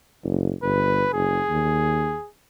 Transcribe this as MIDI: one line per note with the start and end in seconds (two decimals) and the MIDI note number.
0.24 0.52 30
0.63 1.05 31
0.63 1.10 71
1.14 1.40 30
1.14 2.29 68
1.49 2.16 39